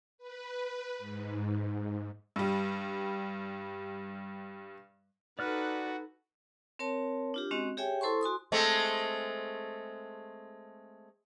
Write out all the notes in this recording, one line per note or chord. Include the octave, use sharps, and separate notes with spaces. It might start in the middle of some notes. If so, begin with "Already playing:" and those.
B4
G#2
G2 G3
D#4 F#4 A4 B4 D5 F6 F#6
C4 A#4 C#5 A5
D4 F4 G4
G#3 C4 C#4 F#4 D#5
G4 G#4 C#5 E5 G5 G#5
E4 A4 C5 A5 C6 C#6
F#4 G#5 C6 D#6
G#3 A3 C4